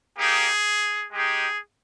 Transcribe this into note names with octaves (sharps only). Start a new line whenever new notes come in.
A#3 D#4 G4 G#4
G#3 D#4 G4 G#4